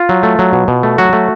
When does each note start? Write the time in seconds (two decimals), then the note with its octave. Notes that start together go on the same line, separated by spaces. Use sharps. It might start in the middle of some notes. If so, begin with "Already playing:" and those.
Already playing: F4
0.09 F#3
0.23 A3
0.39 F#3
0.53 B2
0.68 B2
0.83 A3
0.98 F#3 F#4
1.13 A3